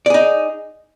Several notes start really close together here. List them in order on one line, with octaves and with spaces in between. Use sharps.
D5 G#4 D#4